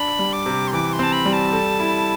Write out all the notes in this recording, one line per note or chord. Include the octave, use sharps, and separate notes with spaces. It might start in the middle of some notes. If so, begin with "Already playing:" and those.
Already playing: D4 B5
G3
D6
C3
C6
E3 D6
C6
C4 A5
B5
G3
A5
A4
E4